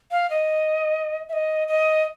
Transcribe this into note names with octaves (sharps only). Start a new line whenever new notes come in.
F5
D#5
E5
D#5
D#5